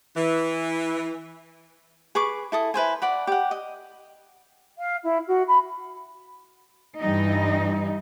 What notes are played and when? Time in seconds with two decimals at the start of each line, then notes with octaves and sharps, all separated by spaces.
0.16 E3
2.15 G#4 B4 C#6 D6
2.52 E4 A4 D#6
2.74 E4 B4 C5 G#5
3.02 D5 F#5 B5
3.27 G4 F#5
3.51 D#5
4.78 F5
5.03 E4
5.27 F#4
5.47 B5
6.99 G2 E3 G3 D#4